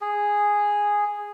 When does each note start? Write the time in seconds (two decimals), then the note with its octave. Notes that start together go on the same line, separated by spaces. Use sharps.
0.01 G#4